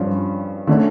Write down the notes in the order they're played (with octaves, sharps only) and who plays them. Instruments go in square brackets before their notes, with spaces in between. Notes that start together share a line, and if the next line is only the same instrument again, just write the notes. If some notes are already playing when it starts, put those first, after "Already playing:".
Already playing: [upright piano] G2 F3 C#4
D3 A3 C#4